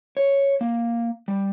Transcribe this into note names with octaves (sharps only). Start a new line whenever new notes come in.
C#5
A#3
G3